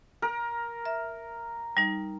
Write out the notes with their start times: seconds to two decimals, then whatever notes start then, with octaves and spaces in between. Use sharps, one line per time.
0.22 A#4
0.85 E5
1.77 G3 D#4